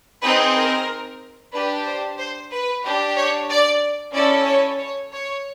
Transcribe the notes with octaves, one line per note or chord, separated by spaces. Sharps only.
C4 D#4 G#4 B4
A#4
D4 G4 B4
C5
C5
B4
D4 G4
C#5
D5
C#4 E4 A4 D5
C#5
C#5
C#5